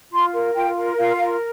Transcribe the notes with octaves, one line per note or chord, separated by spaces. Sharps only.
F4 C6
A#4
F4 G5
A#4
F4 F5
A#4